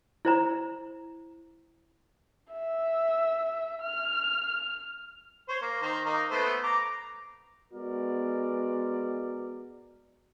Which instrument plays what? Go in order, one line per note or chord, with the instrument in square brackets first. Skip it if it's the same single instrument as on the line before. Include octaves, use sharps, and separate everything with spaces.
[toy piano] E4 C5 A#5
[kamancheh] E5
F6
[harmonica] C5 C#5
A#3
D#3 C5 A#5
A#3 D#4
A3 B3 C5
A#5 D6
[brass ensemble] G#3 B3 F#4 A#4 D5